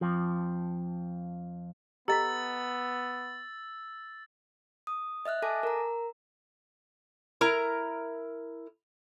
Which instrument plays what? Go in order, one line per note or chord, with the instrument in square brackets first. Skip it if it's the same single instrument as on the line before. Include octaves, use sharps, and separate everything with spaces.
[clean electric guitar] F2 F3
[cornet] B3 [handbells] G4 A4 B6 [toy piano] D#5 A#5 [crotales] E6 A6
[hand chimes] D#6
D#5 E5 F6 F#6
A4 G#5 A5 D6 A#6
A#4 A#5
[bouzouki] E4 A#4 A#5